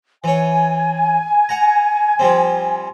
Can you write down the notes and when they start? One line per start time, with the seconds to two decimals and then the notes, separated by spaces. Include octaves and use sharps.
0.24 E3 C#5 G#5
1.49 F#5 A#5
2.19 F3 G3 C4